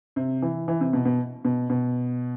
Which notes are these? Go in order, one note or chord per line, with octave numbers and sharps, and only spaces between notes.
C3
E3
E3
C3
B2
B2
B2
B2